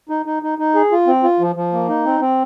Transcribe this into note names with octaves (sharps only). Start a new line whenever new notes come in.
D#4
D#4
D#4
D#4
G#4
F4
C4
F4
F3
F3
A#3
D#4
C4
C4